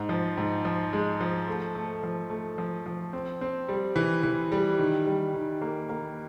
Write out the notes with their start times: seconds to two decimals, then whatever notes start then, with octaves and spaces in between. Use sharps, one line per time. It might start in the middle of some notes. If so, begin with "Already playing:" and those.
Already playing: G#2
0.09 F3
0.37 G#2
0.65 F3
0.93 G#3
1.20 F3
1.47 A3
1.75 A3
2.03 F3
2.30 A3
2.58 F3
2.86 F3
3.13 C4
3.41 C4
3.68 G3
3.96 E3
4.23 E3
4.52 G3
4.78 D#3
5.07 G3
5.34 D#3
5.61 A#3
5.89 A#3